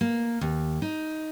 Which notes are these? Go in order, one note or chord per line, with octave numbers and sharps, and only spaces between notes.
A#3
D#2
D#4